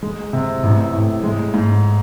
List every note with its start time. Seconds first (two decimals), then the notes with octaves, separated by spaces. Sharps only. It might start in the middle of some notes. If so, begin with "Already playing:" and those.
0.03 G#3
0.33 C3
0.63 A1
0.93 A2
1.23 G#3
1.54 G#2